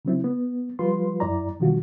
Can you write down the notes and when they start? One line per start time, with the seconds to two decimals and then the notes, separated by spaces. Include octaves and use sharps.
0.05 C#3 F#3 C4 E4
0.24 B3
0.79 F3 G3 F4 B4 C6
1.20 F#2 E4 D5 A#5
1.60 B2 D#3 F3 G3 F4 F#4